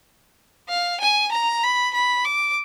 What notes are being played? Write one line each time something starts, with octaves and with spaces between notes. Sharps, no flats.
F5
G#5
A#5
B5
B5
D6